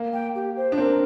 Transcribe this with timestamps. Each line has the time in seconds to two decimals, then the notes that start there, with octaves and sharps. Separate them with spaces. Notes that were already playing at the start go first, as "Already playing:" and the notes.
Already playing: A#3
0.13 G5
0.35 G4
0.57 C5
0.72 D4
0.78 C4 A#4